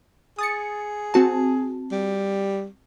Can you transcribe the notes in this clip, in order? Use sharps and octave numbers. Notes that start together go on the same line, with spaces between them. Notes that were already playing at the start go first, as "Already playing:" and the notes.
G#4 D#6 A6 C#7
C4 F#4 A5
G3